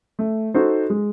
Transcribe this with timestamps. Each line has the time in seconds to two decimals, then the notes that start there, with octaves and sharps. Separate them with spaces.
0.19 A3
0.54 D#4 F#4 A4 C5
0.90 G#3